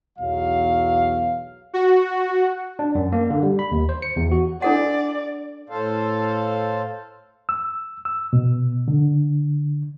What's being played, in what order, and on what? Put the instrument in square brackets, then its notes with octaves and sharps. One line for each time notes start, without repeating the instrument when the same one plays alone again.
[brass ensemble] B1 E2 F#3 F5
[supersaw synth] F#4
[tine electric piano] D4
F#2
A#3
D3
G3
B5
D#2
C5
C#7
E2
F#4
[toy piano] D4 A4 F#5 [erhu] D5
[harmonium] A2 A4 C5 F5
[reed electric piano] E6
E6
B2
D3